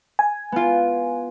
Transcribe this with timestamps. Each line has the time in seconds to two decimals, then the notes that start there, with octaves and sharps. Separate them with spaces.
0.19 G#5
0.52 B3 F4